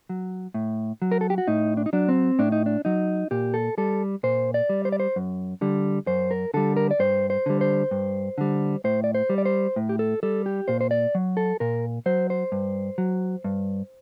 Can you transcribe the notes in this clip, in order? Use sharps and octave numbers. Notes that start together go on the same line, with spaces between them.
F#3
A2
F#3
A#4
A4
G4
F#4
A2 D#4
D4
D#4
F#3 D4
C4
A2 D4
D#4
D4
F#3 D#4
A#2 G4
A4
G3 A4
A#2 C5
D5
G3
C5
D5
C5
F#2
D3 G3
F#2 C5
A#4
D3 G3 A4
A#4
D5
G2 C5
C5
D3 G3
C5
G2
D3 G3
A2 C5
D5
C5
G3
D5
C5
A2
G4
A4
G3 A4
G4
A#2 C5
C5
D5
F#3
A4
A#2 A#4
F#3 C5
C5
G2
F#3
G2